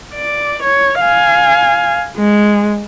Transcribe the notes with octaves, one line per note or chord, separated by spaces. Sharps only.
D5
C#5
F5 G#5
G#3